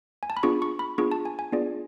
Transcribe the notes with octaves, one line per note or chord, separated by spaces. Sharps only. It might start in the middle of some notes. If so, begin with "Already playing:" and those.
G#5
A5
B5
B3 D4 F4 G#4 C#6
C#6
B5
B3 D4 F4 G#4 C#6
A5
G#5
G#5
B3 D4 F4 G#4 D5